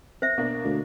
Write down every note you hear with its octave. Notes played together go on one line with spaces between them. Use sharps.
C5 E5
B2 A#3 D4
D2